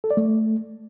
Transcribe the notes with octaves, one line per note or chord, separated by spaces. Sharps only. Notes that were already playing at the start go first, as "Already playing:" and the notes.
A4
D5
A3